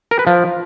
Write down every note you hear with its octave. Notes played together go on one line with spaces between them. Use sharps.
A#4
B4
F3